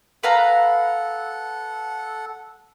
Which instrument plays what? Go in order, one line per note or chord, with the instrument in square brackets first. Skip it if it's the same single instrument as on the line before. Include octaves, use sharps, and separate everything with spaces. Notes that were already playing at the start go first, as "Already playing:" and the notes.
[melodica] A4 F#5 [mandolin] B4 F5 A#5